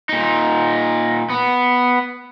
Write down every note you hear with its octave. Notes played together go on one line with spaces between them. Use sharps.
A#2 D#4
B3